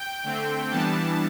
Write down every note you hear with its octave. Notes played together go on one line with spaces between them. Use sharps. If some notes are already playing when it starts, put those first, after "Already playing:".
Already playing: G5
D3 A3 C4
E3 G3 B3 D4 A5